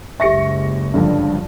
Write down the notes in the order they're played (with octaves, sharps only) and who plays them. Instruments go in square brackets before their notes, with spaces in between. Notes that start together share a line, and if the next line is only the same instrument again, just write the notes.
[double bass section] F#1 C#2 [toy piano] G4 E5 [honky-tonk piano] C#6 A#6 C#7
[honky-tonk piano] G2 D3 F3